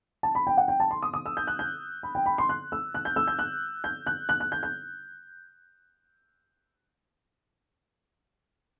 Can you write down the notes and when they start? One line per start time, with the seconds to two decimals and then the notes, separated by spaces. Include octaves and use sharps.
0.23 A5
0.35 B5
0.47 G5
0.57 F#5
0.68 G5
0.80 A5
0.91 C6
1.03 D#6
1.14 D#6
1.26 E6
1.37 G6
1.47 F#6
1.59 G6
2.03 B5
2.15 G5
2.26 B5
2.38 C6
2.49 F#6
2.72 E6
2.94 F#6
3.05 G6
3.16 E6
3.27 G6
3.39 F#6
3.84 G6
4.06 F#6
4.29 F#6
4.40 F#6
4.52 G6
4.63 G6